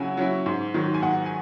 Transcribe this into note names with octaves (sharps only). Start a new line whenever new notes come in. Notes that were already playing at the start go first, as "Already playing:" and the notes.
Already playing: C#3 F#3 C#4 E4 F#5 G#5
F#3 C#4 E4
G#2
D#3 F#3
G#5
G#2 F#5
G#5